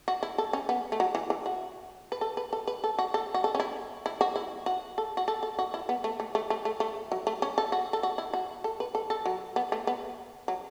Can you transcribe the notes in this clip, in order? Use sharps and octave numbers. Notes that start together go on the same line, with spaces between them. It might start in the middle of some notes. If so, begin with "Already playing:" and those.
F#4
E4
A4
C#4
B3
A3
F#3
E3
E3
F#4
B4
A4
B4
A4
B4
A4
F#4
A4
F#4
A4
C#4
E4
E4
F#4
E4
F#4
A4
F#4
A4
A4
F#4
E4
B3
A3
A3
A3
A3
A3
A3
F#3
A3
C#4
A4
F#4
A4
F#4
E4
F#4
A4
B4
A4
A4
F#3
B3
A3
B3
F#3